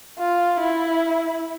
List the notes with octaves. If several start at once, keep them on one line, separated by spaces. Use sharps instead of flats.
F4
E4